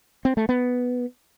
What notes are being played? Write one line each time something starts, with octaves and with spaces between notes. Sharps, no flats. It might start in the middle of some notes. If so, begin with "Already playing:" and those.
C4
A3
B3